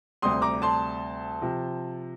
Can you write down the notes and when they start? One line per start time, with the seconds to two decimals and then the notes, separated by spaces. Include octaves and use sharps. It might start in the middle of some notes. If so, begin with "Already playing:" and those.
0.22 D2 C3 G3 C4 C6 D#6
0.42 A#5 D6
0.62 A5 C6
1.42 C3 F3